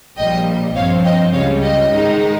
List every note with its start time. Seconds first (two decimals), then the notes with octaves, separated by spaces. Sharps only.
0.17 A#1 A#2 G3 D#5 G5
0.75 G2 F3 C4 C#5 F5
1.05 D#5 G5
1.33 C#2 C#3 G3 C#5 F5
1.62 D#5 G5
1.91 G#2 D#3 G#3 D#4